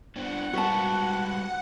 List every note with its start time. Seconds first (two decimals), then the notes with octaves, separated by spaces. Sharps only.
0.16 B3 C4 D4 F#5
0.53 G3 G#3 F#4 B4 A5